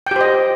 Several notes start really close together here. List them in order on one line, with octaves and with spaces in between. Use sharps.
G5 G4 C5 D#5